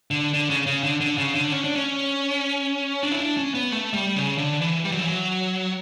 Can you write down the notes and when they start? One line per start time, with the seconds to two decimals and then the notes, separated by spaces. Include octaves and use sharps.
0.11 D3
0.34 D3
0.50 C#3
0.67 C#3
0.83 D3
1.01 D3
1.18 C#3
1.35 D3
1.52 C#4
1.64 D4
1.76 C#4
3.03 D4
3.12 E4
3.20 D4
3.37 C#4
3.54 B3
3.71 A3
3.93 G3
4.16 C#3
4.38 D3
4.61 E3
4.84 G3
4.92 F#3
4.99 E3
5.07 F#3